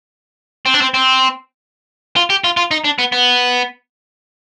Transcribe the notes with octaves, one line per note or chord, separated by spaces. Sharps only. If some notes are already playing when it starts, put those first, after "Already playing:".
C4
D4
C4
C4
F4
G4
F4
F4
D#4
D4
B3
B3